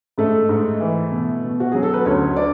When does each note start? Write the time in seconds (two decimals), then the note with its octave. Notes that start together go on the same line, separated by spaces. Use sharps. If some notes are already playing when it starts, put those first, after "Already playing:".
0.18 G#2 A3 A4
0.49 G#2
0.81 E3
1.12 B2
1.44 B2
1.60 F#4
1.72 F#3 G#4
1.83 A4
1.94 B4
2.05 D2 C#4 C#5
2.36 D4 D5